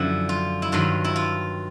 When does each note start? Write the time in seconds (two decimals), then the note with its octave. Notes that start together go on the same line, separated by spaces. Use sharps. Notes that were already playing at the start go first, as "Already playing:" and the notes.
Already playing: F#2 D3 F3 E4
0.29 F4
0.62 E4
0.72 G2 D#3 F#3 F4
1.04 E4
1.16 F4